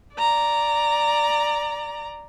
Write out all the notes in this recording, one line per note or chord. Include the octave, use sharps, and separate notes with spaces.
D5 A#5